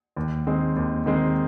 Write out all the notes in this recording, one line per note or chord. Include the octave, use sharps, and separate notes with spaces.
D#2
D#3 G#3 C4
D#2
D#3 G#3 C4